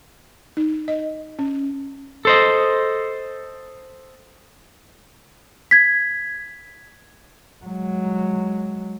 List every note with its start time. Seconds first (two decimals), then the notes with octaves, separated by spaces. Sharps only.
0.57 D#4
0.88 D#5
1.39 C#4
2.25 A4 C5 D#5
5.71 G#6 B6
7.65 F#3 G#3